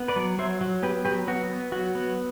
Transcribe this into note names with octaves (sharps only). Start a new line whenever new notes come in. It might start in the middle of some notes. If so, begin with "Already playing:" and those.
Already playing: B3
B4 D5
F#3
F#3 C5 E5
F#3
B3 G4 B4
F#3 G4 B4
B3 F#4
B3
F#3 F#4
B3